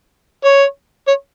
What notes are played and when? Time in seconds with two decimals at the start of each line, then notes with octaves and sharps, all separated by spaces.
0.45 C#5
1.07 C#5